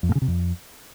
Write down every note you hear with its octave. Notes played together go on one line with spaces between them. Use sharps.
F2
A2
C#3
C3
F2